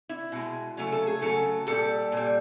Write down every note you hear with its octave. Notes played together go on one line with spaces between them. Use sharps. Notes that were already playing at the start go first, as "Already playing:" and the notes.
E4
B2 G#3
C#3 F#3 A3
A4
G#4
C#3 F#3 A3 A4
A#2 G3 A4
A#2 G3